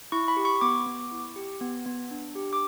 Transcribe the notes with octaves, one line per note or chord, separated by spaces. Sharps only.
E4 C#6
B5
G4
C#6
B3 D6
B3
E4
G4
B3
B3
D4
G4
D6